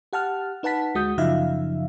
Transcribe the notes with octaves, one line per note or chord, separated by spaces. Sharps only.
G4 F#5 A5 F6
D#4 B4 F#5 A5 B6
D2 G#3 F#4 D#6 G6
F#2 C#3 F3 D#4 E5 F5